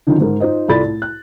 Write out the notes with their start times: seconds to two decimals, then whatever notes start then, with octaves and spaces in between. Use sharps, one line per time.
0.07 D3 D#3 F#3 C#4 D#4 F4
0.20 G#2 A#4
0.40 D#4 F4 C5 D#5
0.68 C2 F4 A4 D5 B5 A6
0.83 A2
1.02 F#6